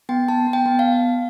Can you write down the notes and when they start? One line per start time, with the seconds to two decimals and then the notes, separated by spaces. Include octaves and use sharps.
0.09 B3 G5
0.28 B3 A5
0.47 B3
0.53 G5
0.66 B3
0.79 F5